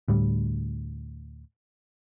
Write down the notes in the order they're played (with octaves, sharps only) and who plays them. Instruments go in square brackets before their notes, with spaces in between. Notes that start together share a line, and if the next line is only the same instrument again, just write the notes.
[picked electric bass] D2 A2 G3